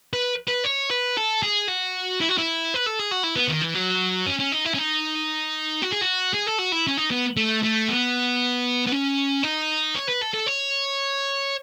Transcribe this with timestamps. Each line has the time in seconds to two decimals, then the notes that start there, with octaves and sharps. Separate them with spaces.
0.13 B4
0.48 B4
0.65 C#5
0.91 B4
1.17 A4
1.43 G#4
1.68 F#4
2.20 E4
2.29 F#4
2.37 E4
2.74 B4
2.86 A4
2.99 G#4
3.11 F#4
3.23 E4
3.36 B3
3.49 D#3
3.62 E3
3.75 F#3
4.27 C#4
4.39 C#4
4.52 D#4
4.65 E4
4.74 C#4
4.78 D#4
5.82 F#4
5.92 G#4
6.01 F#4
6.33 G#4
6.47 A4
6.58 F#4
6.72 E4
6.87 C#4
6.97 D#4
7.11 B3
7.37 A3
7.63 A3
7.88 B3
8.86 B3
8.92 C#4
9.43 D#4
9.95 C#5
10.08 B4
10.21 A4
10.34 A4
10.46 C#5